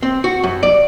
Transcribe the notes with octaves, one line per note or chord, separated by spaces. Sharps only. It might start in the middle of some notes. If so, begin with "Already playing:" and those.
C4
F#4
F#2
D5